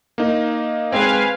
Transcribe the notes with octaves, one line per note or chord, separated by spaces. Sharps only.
A#3 D#4
G#3 C4 B4 F5 G#5